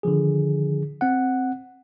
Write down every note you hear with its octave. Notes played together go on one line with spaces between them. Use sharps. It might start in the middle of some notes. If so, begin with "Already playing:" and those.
D3 D#3 F3 G#4
C4 F#5